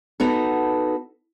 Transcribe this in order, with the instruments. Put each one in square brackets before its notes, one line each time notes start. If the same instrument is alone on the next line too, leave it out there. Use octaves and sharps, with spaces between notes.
[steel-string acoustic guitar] B3 D#4 F#4 A4